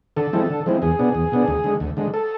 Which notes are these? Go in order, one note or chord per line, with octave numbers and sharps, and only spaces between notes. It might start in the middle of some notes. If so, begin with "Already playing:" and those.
D3 A4
F3 G#3 C4 E4
D3
F3 G#3 C4 E4
E2 G#4
B2 B3 D4
E2
B2 B3 D4
D2
D3 G#3
D2
D3 G#3
A4